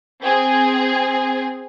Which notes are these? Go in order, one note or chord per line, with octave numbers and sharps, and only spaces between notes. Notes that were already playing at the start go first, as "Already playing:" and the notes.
C4 G#4